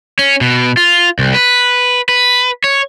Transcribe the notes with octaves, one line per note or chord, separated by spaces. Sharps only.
C#4
B2
F4
C2
B4
B4
C#5